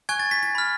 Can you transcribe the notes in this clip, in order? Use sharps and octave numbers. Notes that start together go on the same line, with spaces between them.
G#5 C#6 F#6 G#6
A6
B6
B6
B5 F6